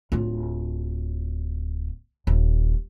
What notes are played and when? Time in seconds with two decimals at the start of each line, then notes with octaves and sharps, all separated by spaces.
0.12 D1 F4
2.27 D#1